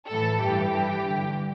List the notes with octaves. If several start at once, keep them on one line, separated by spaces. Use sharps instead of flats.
A2 E3 A4
G2 E3 G4
G2 E3
G2 D3